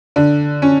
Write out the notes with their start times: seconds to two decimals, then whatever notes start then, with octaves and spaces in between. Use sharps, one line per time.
0.16 D3
0.62 C#4